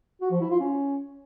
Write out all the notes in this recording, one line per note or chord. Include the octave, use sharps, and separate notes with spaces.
F#4
F3
E4
F4
C#4